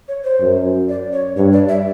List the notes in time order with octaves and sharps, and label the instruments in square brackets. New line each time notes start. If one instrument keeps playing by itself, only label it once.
[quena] C#5
C5
[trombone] F#2
[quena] D5
C#5
[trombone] G2 [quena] C#5
[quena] D5
E5